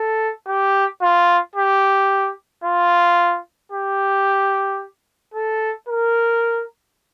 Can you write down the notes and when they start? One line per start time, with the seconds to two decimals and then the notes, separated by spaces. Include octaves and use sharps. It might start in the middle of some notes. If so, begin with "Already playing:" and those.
Already playing: A4
0.48 G4
1.02 F4
1.56 G4
2.64 F4
3.72 G4
5.34 A4
5.89 A#4